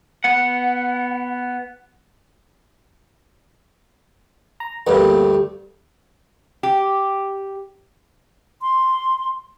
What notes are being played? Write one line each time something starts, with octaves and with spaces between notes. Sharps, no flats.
B3 F#5
A#5
D2 G2 A#3 B3
G4
C6